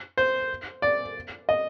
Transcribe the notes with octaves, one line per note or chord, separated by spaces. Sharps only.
C5
D5
D#5